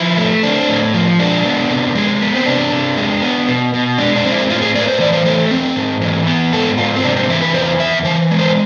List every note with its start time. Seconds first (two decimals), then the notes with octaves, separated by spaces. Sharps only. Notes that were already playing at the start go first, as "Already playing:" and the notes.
Already playing: F3 E4
0.17 A3
0.43 C4 D4
0.68 A2
0.94 F3
1.19 G#3 D4
1.45 B3
1.70 C3
1.95 G#3
2.21 B3
2.35 C4
2.46 C3 D4
2.72 C3
2.97 G#3
3.22 B3
3.48 B2
3.74 B2
3.98 G#3 D4
4.16 D4
4.25 C4
4.32 E4
4.49 A2 F4
4.62 G#4
4.75 A2 D5
4.82 B4
4.88 C5
5.00 E3 D5
5.13 C5
5.25 A3 C5
5.51 C4
5.76 G#2
6.02 E3
6.27 B3
6.52 G#2 A4
6.78 G#2 F4
6.96 C4
7.03 C3 D4
7.17 C4
7.28 E3 E4
7.42 B4
7.54 E2 C5
7.79 E2 E5
8.05 E3 C5
8.31 G#3
8.39 C5